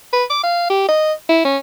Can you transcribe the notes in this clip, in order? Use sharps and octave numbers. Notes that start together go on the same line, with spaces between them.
B4
D6
F5
G4
D#5
E4
C#4